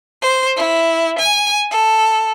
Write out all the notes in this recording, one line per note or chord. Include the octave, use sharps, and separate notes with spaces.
C5
E4
G#5
A4